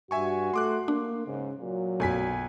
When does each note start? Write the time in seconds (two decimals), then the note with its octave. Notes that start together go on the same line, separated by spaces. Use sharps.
0.11 G2 F#4 E5 G#5 C#6
0.54 A3 C6 D6 F#6
0.88 A#3 D4
1.26 G#2 C#3
1.60 A#2 F#3
2.00 B1 F#2 A3 G#5 B6